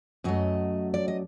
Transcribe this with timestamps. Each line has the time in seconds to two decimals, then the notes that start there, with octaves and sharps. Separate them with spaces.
0.24 F#2 F#3 A3 D#5
0.94 D5
1.08 D#5